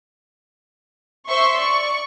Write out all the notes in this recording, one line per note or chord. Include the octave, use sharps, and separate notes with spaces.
C5 E5 C6 C#6
D5 C#6